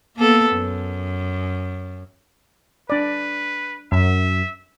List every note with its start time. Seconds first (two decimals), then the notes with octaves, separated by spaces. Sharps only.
0.17 A#3 B3 A4
0.53 F#2
2.90 D4 B4 D5
3.92 F#2 E5